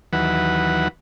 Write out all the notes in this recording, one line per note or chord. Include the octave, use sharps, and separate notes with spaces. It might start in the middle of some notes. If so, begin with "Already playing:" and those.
D#2 E3 F#3 B4 F#5